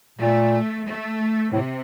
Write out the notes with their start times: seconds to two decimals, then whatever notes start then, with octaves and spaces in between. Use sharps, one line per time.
0.19 A#2 A3
0.86 A3
1.52 A2 C3